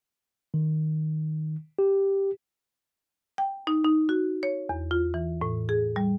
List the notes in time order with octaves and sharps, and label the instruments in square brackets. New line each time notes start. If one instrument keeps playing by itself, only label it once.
[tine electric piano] D#3
G4
[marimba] G5
D#4
D#4
F#4
C#5
E2
F4
E3
A2
G#4
G3